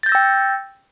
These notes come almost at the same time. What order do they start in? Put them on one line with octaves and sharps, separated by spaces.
A6 G6 A#6 E6 G5